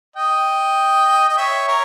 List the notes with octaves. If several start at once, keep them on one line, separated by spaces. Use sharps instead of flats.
D#5 G5
D#5
C#5 E5
A#4 C#5